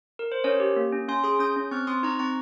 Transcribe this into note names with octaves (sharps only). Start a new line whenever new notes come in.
A#4
C5
C#4 A#4 C#5
G4
A#3
C#4
C#4 G#5 C6
G#4 C6 D#6
C#4 D#6 G6
C#4
C4 C#6 F6
C4 C6 D#6
D#4 A#5 C#6
C4 A#5 C#6